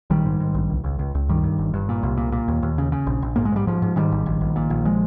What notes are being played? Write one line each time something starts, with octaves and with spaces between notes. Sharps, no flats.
A#1 D#3 G3
G#2
G#2
A#1
C#2
C#2
C#2
C#2
G2 D#3 G3
G2
G1
G2
A#2
C2
A#2
A#2
D#2
D#2
C#3
C#3
A#1
A#1
G#2 A#3
G#3
G#2 G3
G#2 F3
G#2
G#2 D#3 G3
G#1
A#1
A#1
A#2
A#1
F3 G#3